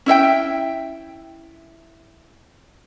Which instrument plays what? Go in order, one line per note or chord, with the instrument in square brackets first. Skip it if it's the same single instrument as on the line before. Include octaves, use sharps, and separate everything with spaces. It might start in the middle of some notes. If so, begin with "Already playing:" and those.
[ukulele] C#4 E4 E5 G5